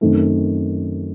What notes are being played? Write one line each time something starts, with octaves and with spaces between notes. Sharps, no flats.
F#2 D#3 A3 C4